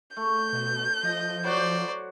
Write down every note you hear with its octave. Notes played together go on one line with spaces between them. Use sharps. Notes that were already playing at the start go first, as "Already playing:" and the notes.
A3 G6
B2
F3 D#5
F#3 F#4 C5 D5